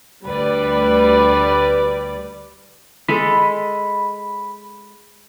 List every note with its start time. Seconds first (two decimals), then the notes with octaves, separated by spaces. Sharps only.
0.24 D2 G3 B4 D5
3.08 G#3 A4 B5